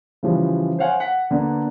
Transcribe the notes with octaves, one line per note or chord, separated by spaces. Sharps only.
C#3 E3 F3 G3
C5 C#5 F5 F#5 G#5
F#5 B6
D3 A#3 B3 D4